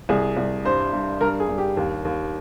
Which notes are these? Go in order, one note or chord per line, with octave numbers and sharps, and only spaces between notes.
C2 G#4
C2
G2 C5
G2
G2 A#4
G#4
G2
G4
D#2
D#2